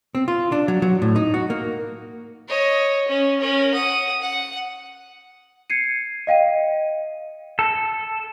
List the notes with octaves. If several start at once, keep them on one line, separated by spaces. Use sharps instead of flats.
C4
F4
D4
F#3
F#3
A2
D#4
F#4
A#3
C#5 D#5
C#4
C#4 A#4
F#5 D#6
F#5
G#6 C7 C#7 D#7
D#5 F5 G5 D#7
A4